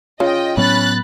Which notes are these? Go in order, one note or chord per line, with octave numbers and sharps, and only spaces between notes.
C#3 F4 D#5 G5
A2 F#3 B3 C#4 B5 F#6 A6